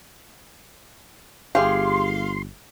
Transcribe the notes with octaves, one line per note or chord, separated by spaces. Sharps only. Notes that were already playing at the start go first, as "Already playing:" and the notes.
G1 G4 G#4 F5 C6